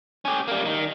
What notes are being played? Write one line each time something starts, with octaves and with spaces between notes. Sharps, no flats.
C#4 G4
G3 A#3
D#3